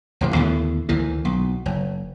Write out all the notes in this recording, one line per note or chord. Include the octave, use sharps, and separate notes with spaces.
E1 A1 D#3
D#2 A2 D3 B3
D2 D#3 E3 A#3
B1
F#1